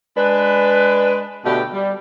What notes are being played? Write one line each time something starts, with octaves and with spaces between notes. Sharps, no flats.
G#3 D4 B4
B2 D3 A3 B3 G4
G3